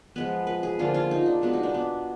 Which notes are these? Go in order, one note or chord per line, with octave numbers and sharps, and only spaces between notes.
F3 G#3 B3 B4
B4
G#4
D3 F3 A#3 F4
F4
D#4
D4
B2 G#3 B3 D4
D#4
D4
B3